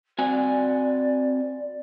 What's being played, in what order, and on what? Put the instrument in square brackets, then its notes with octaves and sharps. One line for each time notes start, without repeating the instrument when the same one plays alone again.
[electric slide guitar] C4 F#4 G#5 [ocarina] D5